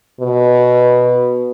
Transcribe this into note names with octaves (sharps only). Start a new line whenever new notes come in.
B2